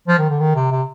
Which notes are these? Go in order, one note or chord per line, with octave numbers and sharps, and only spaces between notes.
F3
D#3
D3
D#3
C3
C3